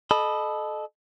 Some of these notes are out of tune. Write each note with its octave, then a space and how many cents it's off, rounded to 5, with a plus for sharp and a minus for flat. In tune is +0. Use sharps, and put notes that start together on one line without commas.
A4 -25 D#5 -25 B5 +0